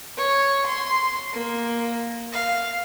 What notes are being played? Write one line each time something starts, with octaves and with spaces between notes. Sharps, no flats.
C#5
C6
A#3
F5